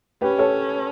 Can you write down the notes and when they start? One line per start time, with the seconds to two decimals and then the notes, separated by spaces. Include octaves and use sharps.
0.22 C#4 G4 B4
0.38 A4 C#5